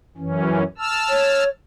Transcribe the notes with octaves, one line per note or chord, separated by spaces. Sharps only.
F#2 E3 C#4
A5 E6 F6
C#5